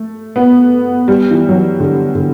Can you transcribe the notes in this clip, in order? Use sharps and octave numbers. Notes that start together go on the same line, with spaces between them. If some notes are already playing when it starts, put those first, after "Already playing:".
Already playing: A3
B3
G3
E3
F#3
E3
D3
D3